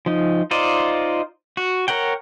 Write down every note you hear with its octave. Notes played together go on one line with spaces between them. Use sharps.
F3 D#4
D#4 F4 C5 D5 D#5
F#4
A#4 C#5 F#5 G5